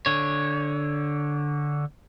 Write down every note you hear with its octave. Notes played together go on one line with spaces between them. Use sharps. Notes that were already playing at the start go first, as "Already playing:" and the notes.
D3 C#5